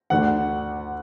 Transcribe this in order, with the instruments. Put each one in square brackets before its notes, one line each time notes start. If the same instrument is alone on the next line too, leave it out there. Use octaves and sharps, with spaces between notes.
[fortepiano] D2 D3 F#5